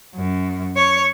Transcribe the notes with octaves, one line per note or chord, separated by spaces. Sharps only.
F#2
C#5